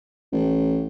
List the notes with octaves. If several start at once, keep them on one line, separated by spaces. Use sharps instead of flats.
A1